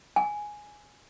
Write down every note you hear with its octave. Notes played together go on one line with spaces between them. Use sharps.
G#5